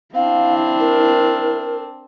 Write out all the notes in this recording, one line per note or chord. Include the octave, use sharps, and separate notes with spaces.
C4 D4 E4 F5
A#4